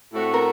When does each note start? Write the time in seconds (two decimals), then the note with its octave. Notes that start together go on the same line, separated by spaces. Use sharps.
0.13 A2 A3 C4 F#4
0.34 A#4